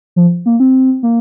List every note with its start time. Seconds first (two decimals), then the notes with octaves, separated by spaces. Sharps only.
0.16 F3
0.46 A#3
0.60 C4
1.03 A#3